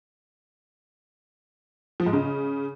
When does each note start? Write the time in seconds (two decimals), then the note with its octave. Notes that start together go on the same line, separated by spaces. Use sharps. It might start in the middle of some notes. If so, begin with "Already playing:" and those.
2.00 F3
2.06 G#2
2.13 C#3